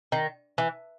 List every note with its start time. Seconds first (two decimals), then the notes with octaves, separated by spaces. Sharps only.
0.12 D#3
0.58 E3